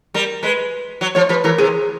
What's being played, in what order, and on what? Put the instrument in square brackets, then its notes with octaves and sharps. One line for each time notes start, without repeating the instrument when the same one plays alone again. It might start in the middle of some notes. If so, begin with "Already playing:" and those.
[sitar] G3 [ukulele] A#4
[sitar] G#3 [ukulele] B4
[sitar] F#3
[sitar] F3 [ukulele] C#5
[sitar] F3 [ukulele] B4
[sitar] E3 [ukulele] A#4
[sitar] C3 [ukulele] G#4